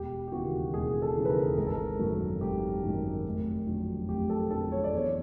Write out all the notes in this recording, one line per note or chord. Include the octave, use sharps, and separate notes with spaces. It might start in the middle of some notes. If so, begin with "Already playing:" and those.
Already playing: E1 G4
G4
D#2 C#3 E3 F#4
E1 G#4
A4
D#2 C#3 E3
B4
A#4
G#1 A#4
A4
A#4
F#2 D#3 F#3
G#1 G4
F#2 D#3 F#3
F1
F2 D3 F#3
F1 G4
A4
F2 D3 F#3 A4
C#5
D5
E2 C#5